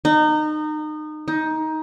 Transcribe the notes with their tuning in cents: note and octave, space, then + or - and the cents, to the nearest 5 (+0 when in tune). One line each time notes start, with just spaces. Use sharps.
D#4 -25
D#4 +15